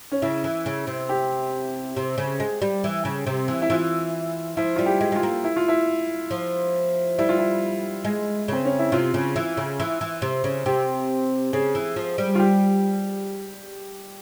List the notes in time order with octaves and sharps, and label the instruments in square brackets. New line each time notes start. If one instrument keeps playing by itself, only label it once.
[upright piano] C#4
[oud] C#3 [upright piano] E4
[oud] E3
C#3
C3
[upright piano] G4
[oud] C3
C#3
G#3
G3
E3
C#3
C3
E3
[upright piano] E4
[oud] E3 [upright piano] F4
[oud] F3 [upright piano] E4
[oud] G3 [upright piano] F4
[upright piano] G4
[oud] G#3
[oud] G#3 [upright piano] F4
[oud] A#3
[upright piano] E4
F4
E4
[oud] F3
[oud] G3 [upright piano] E4
[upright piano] F4
E4
[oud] G#3
[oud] C#3 [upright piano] C4
[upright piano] C#4
E4
[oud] C3 [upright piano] F4
[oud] C#3
E3
C#3
E3
E3
C3
C#3
[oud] C3 [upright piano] G4
[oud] C#3 [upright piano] G#4
[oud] E3
F3
G3
[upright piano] F4
G4